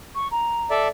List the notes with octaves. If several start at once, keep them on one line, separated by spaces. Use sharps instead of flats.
C#6
A#5
A4 D5 E5